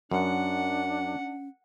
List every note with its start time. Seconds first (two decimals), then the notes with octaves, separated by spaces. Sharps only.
0.11 F#2 C#4 D4 F#5